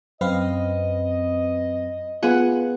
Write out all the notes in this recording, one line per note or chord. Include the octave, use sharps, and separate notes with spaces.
F#2 C4 B4 D#5 F5
B3 F4 G#4 F#5